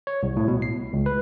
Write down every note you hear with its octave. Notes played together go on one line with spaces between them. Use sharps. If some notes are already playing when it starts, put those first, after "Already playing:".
C#5
C2
A2
B2
C7
C#2
B4